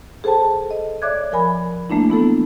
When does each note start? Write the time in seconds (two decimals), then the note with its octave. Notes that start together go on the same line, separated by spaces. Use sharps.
0.24 G#4 A4 C5 G5 A5
0.71 D#5
1.02 C#5 D5 E5 D6 F#6 G#6
1.32 F3 A#4 G#5 B5
1.90 E3 A3 A#3 D4 E4
2.10 B3 E4 A4